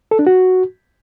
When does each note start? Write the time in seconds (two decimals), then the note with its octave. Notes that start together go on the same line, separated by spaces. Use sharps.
0.11 A4
0.19 D4
0.27 F#4